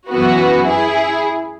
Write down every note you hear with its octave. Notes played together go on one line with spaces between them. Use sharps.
F#2 E3 B3 F#4
E4 G#4